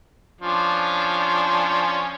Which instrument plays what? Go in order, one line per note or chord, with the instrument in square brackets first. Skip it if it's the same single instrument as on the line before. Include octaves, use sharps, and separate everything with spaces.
[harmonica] F3 C#4 D4